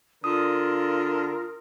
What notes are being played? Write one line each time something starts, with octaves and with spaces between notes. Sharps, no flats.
D3 F4 A#4 D#6